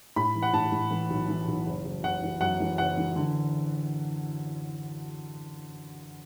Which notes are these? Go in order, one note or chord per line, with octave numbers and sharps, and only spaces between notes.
A2 B5
E3
F#5
A2 A5
A2
E3
B1
E3
B1
F#1
F#1
F#1 F#5
E3
F#2 F#5
E3
F#1 F#5
E3
D3